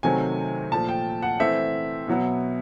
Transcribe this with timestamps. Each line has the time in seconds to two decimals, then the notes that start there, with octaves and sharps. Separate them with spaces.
0.03 C3 D#3 F#3 A3 C4 G#5
0.72 A#2 F3 A3 A5
0.89 G5
1.22 F#5
1.39 E3 A3 C4 E5
2.07 B2 F#3 B3